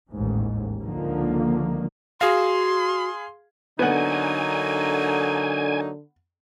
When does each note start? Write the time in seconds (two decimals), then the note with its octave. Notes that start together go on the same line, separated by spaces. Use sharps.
0.11 A1 D#2 G#2
0.82 C#2 D3 D#3 F3 A#3
2.21 F#4 G#4 F5 C6
3.79 D3 F#3 A#3 B3 D#4 F#5 G#5